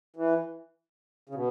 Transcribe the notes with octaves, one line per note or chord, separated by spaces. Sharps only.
E3
C#3
B2